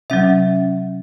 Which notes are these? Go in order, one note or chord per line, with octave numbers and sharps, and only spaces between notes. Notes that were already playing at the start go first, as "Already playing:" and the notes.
C3 F#3 C#4 E5